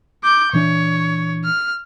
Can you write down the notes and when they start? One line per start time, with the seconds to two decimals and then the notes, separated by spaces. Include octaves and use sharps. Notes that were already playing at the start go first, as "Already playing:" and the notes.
0.23 D6 G6
0.53 A#2 E3 D4 C#5
1.44 F6